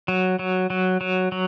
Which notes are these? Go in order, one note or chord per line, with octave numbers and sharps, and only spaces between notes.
F#3
F#3
F#3
F#3
F#3